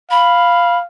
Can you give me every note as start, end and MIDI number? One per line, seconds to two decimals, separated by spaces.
0.10 0.84 77
0.10 0.78 83